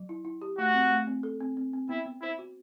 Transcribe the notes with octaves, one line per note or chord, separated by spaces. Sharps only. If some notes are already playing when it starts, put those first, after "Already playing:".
Already playing: F#3
E4
E4
G4
A3 F#4
C4
A3
C4
A4
C4
C4
C4
B3 E4
B3
E4 C5
F#4